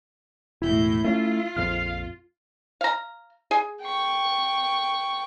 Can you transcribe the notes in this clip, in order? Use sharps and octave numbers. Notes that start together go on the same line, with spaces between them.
E1 A2 E4 G6
A3 C#4 F4
A#1 F2 C4 F5
F5 A#5
G#4
G5 C#6